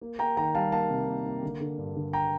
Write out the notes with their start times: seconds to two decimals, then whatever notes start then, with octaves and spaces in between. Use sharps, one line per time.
0.01 A#3
0.19 A#3 G5 A#5
0.37 D#3 G5 A#5
0.55 G3 F5 A5
0.72 A#3 F5 A5
0.90 C3
1.07 A#3
1.26 A#3
1.43 D3
1.60 D3
1.78 G2
1.96 D3
2.13 G5 A#5